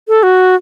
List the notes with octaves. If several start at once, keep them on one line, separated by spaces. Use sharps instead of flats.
A4
F#4